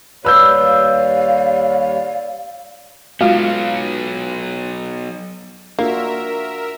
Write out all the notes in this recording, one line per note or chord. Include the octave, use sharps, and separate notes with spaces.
D#2 G3 B4 C#5 D5 F5 E6 G6
F#3 G#3 B3 F4 F#4 F5
A#3 D4 F4 F#4 A#4 E5